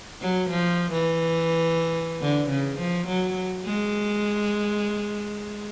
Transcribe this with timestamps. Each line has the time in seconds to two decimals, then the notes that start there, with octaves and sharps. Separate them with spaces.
0.22 F#3
0.50 F3
0.92 E3
2.21 D3
2.50 C#3
2.79 F3
3.07 F#3
3.65 G#3